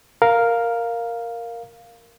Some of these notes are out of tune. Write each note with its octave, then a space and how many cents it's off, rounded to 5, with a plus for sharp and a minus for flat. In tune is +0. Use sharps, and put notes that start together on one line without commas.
A#4 +0 F5 +0